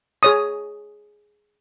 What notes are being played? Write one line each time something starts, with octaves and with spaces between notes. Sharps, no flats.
G#4 C#5 D#6